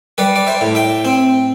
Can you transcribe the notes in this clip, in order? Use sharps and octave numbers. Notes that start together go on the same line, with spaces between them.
G3 B4 D5
D5
C5 E5
A2
E5 G5
C4